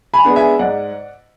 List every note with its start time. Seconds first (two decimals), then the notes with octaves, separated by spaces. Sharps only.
0.14 G#5 B5
0.25 G#3 B3 D4
0.36 E5 G#5
0.59 G#2 D5 F#5